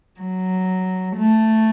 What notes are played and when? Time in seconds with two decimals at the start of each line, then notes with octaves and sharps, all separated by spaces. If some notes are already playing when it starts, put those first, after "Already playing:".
0.20 F#3
1.16 A3